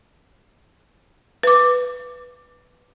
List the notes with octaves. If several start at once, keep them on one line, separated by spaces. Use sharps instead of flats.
B4 D6